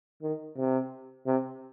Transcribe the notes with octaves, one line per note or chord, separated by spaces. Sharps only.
D#3
C3
C3